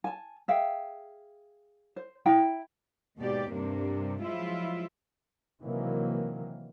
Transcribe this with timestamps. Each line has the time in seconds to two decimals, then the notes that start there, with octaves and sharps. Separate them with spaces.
0.04 G#5 A5
0.48 G#4 E5 F5 G5
1.96 C5
2.26 E4 G5 A#5
3.17 D#2 G#2 B2 G4 D5
3.52 G2 C3 A#3 D4
4.22 F3 F#3 G#3 E4 F4 E5
5.62 C3 D#3 E3 F#3 A#3